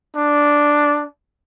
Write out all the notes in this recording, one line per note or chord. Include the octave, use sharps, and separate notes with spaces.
D4